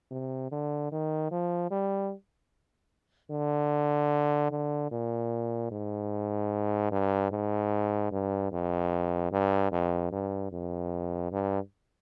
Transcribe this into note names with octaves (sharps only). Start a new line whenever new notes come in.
C3
D3
D#3
F3
G3
D3
D3
A#2
G#2
G2
G#2
G2
F2
G2
F2
G2
F2
G2